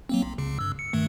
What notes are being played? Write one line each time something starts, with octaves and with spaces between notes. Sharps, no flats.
F#3 A#3 C4
B1
C#2 C#3
G2 E6
C#7
G2 D#3 A3